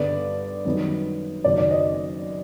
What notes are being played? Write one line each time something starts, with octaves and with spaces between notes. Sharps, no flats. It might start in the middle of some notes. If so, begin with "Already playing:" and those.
Already playing: G2 D3 G3 B3 D5
F#2 D#3 G3 B3
F#1 F#2 D#3 F#3 D5
D5
D#5